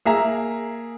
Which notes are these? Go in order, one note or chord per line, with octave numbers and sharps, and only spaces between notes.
A#3 G#4 E5 A#5